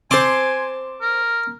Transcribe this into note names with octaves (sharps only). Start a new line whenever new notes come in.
C4 C5 G#5 A5 C6 D6
A#4